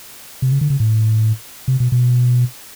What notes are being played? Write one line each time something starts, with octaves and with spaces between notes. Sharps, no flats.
C3
C#3
D3
C#3
A2
C3
B2
B2